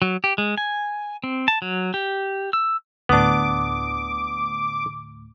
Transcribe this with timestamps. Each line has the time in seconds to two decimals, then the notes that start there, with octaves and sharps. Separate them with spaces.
0.02 F#3
0.24 G4
0.38 G#3
0.58 G#5
1.24 C4
1.48 A5
1.62 F#3
1.94 G4
2.53 E6
3.09 D2 A2 B3 D4 D6 D#6